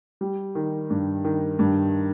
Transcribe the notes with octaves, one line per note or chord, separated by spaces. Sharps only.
G3
D#3
G2
D#3
G2